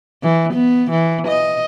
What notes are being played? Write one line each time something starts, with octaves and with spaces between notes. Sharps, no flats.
E3
B3
E3
D#5